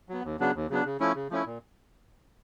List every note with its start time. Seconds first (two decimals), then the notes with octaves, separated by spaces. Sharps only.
0.09 F#3 B3
0.24 D#2
0.40 C#3 F#3 B3 D4
0.55 D#2
0.70 C#3 F#3 B3 D4
0.85 C#3
1.00 F3 A3 C#4 E4
1.15 C#3
1.30 F3 A3 C#4 E4
1.46 A#2